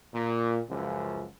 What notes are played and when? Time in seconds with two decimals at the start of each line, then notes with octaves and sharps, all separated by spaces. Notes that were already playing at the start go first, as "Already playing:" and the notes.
0.14 A#2
0.69 C#2 F#2 F3